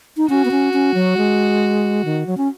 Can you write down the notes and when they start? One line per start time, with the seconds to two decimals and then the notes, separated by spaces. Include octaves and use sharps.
0.17 D#4
0.29 C#4 F#4
0.45 B3
0.51 C#4
0.73 C#4
0.94 F#3
1.17 G#3
2.05 D#3
2.27 F#3
2.37 C#4